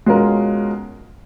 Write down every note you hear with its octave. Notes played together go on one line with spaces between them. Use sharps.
B2 G#3 C#4 F4 A#4